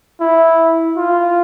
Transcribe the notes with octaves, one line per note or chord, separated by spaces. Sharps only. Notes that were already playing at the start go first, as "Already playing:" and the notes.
E4
F4